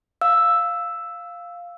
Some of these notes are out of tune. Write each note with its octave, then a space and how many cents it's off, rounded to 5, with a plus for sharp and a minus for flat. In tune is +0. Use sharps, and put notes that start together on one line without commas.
F5 +0 E6 +0